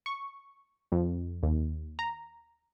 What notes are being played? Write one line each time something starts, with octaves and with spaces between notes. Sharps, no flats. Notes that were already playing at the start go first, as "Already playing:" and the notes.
C#6
F2
D#2
A#5